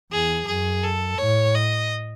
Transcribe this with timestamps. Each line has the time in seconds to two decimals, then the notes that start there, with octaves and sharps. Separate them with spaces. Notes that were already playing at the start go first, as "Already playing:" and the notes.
0.11 E2 G#4
0.47 F#2 G#4
0.83 A4
1.18 A2 C#5
1.54 D#5